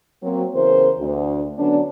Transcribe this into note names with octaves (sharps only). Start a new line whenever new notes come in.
F#3 A#3 C4
E2 C#3 E3 A#4 C5
D2
D3 F#3 B3 C#4 D4